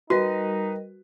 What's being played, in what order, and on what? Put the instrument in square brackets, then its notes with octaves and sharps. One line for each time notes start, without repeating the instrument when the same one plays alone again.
[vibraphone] G3 A#4 D#5 [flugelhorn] D#4 [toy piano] F#4 [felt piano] B4